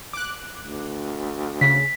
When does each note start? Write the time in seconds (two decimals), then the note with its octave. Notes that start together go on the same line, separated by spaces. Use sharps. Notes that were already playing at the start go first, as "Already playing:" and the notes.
0.13 D6 F#6
0.60 D2
1.61 C#3 B6